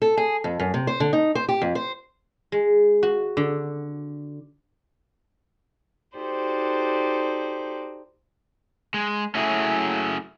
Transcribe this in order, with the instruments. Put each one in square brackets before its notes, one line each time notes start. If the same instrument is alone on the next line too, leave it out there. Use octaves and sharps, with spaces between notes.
[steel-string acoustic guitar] A4
G#4
F2
F#2
C3
C5
D3
D#4
C5
G4
F2
C5
[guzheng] G#3
F#4
D3
[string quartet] D#4 F#4 G4 A4 C5 D5
[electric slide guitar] G#3
[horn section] F#3 A3 E4 [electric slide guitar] C#4 F#4 G#4